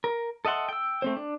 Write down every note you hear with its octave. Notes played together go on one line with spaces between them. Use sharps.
A#4
A4 D#5 E5 F#5 C6
G5 E6
A3 C4 C5
D4